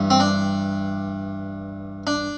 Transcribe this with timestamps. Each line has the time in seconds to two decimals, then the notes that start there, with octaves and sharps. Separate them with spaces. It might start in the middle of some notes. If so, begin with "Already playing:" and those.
Already playing: G2 E3 G3
0.10 C4
0.20 D4
2.07 D4